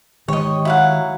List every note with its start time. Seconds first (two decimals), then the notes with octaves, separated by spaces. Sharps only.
0.28 D#3 G#3 G4 C#5 D#5
0.65 F#3 E4 F5 F#5